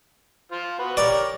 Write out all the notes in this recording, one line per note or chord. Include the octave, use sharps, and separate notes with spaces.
F4 C5
B3 F#4 B4
G4 A#4 C#5 D5